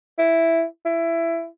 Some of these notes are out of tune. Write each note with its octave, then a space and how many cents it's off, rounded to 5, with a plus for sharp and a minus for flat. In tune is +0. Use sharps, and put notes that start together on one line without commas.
E4 +0
E4 +15